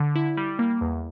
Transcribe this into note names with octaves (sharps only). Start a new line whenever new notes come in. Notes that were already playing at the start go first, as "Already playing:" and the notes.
Already playing: D3
E4
G3
A#3
E2